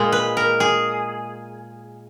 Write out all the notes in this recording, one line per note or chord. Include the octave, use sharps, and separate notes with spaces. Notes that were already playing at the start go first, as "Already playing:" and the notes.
Already playing: A#2 G#3
B4
A#4
G#4